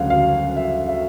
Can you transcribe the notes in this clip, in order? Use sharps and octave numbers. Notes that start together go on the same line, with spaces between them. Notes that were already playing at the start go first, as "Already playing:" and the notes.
Already playing: D2 C#3 F#3 F5 F#5
F5
E5
E5